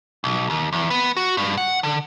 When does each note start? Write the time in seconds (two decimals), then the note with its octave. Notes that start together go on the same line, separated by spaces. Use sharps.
0.24 B1
0.50 D#2
0.73 E2
0.90 B3
1.17 F#4
1.37 G2
1.57 F#5
1.83 D3